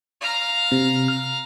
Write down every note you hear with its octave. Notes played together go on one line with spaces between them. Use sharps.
F5 A#5
C3
F6